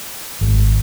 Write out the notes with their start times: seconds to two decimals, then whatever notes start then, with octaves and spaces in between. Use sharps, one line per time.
0.41 G#1